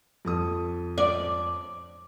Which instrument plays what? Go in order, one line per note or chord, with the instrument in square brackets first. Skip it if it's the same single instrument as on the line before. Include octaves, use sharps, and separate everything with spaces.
[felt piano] F2 A4 D#6
[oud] D5